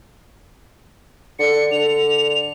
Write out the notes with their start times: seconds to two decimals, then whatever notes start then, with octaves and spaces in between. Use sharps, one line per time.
1.39 D3 C#7
1.72 D3 F7